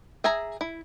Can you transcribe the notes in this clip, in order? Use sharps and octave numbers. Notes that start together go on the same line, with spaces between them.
G#4 E5 G#5 A#5
E4